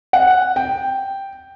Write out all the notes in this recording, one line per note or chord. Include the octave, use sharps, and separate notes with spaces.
F#5
G5